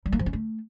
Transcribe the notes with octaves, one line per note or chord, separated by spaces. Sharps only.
G3
A#3
F3
C#4
A3